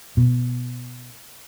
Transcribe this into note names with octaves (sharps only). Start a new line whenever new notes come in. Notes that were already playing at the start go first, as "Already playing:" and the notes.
B2